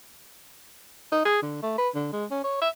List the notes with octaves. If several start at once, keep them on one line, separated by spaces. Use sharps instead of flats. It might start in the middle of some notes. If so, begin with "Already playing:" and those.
D#4
G#4
D3
A3
B4
D3
G#3
C#4
C#5
E5